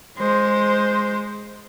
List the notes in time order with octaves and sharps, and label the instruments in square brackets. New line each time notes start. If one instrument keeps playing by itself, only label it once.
[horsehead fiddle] G#3 C5